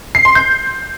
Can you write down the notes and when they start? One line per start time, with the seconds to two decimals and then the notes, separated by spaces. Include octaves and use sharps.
0.15 C7
0.25 C6
0.35 G6